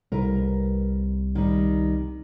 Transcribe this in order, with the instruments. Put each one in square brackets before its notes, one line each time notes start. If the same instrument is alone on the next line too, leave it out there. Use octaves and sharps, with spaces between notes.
[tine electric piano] C2 [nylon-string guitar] A#4 B4
[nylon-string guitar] D#3 G3